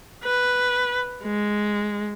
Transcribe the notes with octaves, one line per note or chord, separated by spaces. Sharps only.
B4
G#3